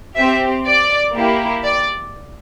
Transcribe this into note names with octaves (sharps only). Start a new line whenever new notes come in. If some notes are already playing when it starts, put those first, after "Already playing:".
C4 G4 E5
D5
A#3 E4 G4
D5